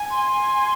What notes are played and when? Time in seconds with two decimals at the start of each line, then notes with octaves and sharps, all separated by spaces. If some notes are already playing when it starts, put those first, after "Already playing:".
Already playing: G#5
0.10 C6
0.30 G#5